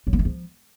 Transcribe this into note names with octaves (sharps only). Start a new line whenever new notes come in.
F#3
A#3
A3
F3